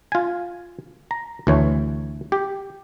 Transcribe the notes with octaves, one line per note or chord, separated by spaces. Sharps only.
F4 G#5
A#5
D2 E3 C#5
G4